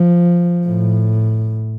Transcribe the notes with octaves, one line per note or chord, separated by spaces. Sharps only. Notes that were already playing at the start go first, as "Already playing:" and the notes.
Already playing: F3
A2